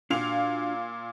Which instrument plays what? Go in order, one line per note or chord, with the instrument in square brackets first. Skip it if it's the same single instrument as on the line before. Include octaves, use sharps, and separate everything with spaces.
[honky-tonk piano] A#2 F5 F7 [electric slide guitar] D4 F#4 G5